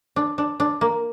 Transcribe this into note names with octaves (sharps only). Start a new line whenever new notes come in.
D4
D4
D4
A#3